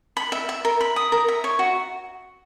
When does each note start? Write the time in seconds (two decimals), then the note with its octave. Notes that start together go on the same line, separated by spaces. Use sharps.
0.17 B5
0.32 E5
0.49 E5
0.65 A#4
0.81 B5
0.96 D#6
1.12 A#4
1.28 E5
1.44 C#5
1.59 F#4